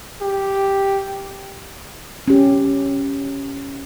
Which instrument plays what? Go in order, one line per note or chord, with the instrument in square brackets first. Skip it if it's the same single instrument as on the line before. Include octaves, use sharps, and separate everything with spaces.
[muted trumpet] G4
[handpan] C#4 G4